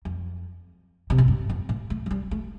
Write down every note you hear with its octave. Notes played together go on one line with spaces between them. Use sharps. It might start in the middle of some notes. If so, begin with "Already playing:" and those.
F2
C3
A2
G2
F2
A2
A3
F3
G3
A3